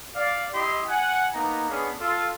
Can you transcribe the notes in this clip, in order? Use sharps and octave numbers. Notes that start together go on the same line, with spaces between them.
D5 F5
E4 G4 D#5 C6
F#5 G#5
A#3 B3 D#4 A#5
B3 C#4 D4 G#4
F4 A4